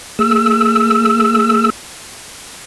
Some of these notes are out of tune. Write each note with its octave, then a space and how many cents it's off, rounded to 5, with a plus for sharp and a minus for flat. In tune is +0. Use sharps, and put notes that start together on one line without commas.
A#3 -40 G#4 +0 E6 +0